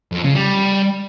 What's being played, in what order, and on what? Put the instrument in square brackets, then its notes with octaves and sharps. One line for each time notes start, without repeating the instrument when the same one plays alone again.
[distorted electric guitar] F2
C#3
G3